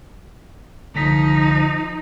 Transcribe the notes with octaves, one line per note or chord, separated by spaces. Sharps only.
C2 D3 F3 D#4 B6